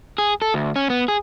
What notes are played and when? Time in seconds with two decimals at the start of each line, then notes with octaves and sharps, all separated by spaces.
0.18 G#4
0.42 A4
0.54 D2
0.76 C#4
0.90 B3
1.08 G#4